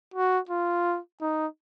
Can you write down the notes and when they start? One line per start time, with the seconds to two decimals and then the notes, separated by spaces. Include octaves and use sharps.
0.14 F#4
0.49 F4
1.21 D#4